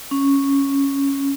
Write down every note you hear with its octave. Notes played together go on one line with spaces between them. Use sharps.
C#4